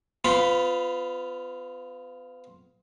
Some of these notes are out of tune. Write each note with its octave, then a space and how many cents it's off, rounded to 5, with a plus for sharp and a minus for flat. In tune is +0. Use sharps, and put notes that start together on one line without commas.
B3 +40 F4 +0 B5 +0